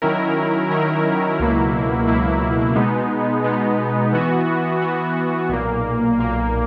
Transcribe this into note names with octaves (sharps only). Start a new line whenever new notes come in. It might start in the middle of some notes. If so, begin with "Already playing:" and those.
D#3 F#3 C#4 E4 A#4
D#3 F#3 C#4 E4 A#4
C#2 B2 F#3 A#3 E4
C#2 B2 F#3 A#3 E4
B2 G#3 B3 D#4
B2 G#3 B3 D#4
E3 B3 F#4
E3 B3 F#4
B1 A#2 A#3
B1 A#2 A#3